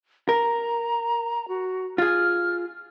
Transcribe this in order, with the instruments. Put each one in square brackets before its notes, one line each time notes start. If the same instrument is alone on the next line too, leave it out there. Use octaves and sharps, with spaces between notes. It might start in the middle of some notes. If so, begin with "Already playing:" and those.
[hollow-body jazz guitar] A#4 [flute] A#5
[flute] F#4
[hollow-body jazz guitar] F4 G#4 [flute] F6